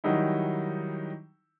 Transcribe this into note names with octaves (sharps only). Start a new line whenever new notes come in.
D#3 F#3 G3 D#4 E4